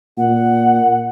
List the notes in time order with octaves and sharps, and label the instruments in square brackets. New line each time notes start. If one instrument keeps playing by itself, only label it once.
[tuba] A#2 [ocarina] F#5